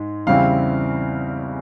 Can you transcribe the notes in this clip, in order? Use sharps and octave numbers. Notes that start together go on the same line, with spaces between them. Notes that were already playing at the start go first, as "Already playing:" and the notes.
Already playing: G#2 G#3
E2 C#3 G3 C4 E4 F5